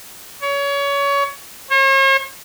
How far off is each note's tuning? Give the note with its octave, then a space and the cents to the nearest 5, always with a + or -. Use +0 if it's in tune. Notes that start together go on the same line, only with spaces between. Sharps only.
C#5 +25
C#5 -45